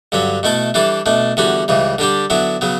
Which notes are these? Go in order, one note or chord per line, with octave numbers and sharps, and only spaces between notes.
G2 D3 F#3 C#4
B2 A3 E4 A4
E3 G3 D4 A4
B2 A3 D4
E2 D3 G3 C#4 F#4
C#2 C#3 E3 G3
D3 G3 D4 G4
D3 F#3 B3 E4
C#3 F#3 B3